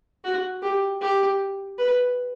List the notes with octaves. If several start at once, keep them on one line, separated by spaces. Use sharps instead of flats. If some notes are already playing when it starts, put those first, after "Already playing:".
F#4
G4
G4
B4